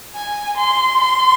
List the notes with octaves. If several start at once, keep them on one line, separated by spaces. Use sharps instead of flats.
G#5
C6
C6